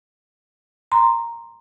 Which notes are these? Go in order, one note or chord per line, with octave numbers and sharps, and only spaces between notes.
A#5 C6